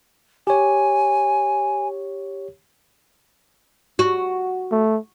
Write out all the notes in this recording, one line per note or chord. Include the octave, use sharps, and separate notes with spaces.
G4 C#5 G#5
F#4
A3